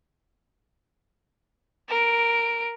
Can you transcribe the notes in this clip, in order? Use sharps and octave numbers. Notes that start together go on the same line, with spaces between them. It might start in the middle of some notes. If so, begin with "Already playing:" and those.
A#4 D7